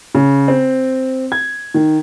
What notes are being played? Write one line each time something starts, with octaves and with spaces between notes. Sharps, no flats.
C#3
C4
G#6
D#3